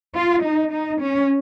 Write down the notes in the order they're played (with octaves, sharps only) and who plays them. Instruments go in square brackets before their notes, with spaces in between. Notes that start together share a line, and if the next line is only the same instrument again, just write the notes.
[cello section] F4
D#4
D#4
C#4